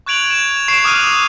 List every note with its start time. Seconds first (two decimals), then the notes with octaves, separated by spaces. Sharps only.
0.06 C#6 F#6 G#6 D7 F7 F#7
0.30 E7 F#7
0.68 C#6 C7 D7 E7
0.84 D6 D#6 F6 F#6 D#7